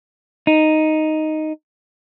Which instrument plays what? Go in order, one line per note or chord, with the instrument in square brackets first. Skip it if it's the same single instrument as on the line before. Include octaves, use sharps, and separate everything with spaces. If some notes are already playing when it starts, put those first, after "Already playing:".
[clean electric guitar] D#4